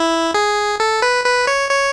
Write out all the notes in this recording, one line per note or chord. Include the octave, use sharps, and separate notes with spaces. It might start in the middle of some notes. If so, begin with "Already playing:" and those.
Already playing: E4
G#4
A4
B4
B4
C#5
C#5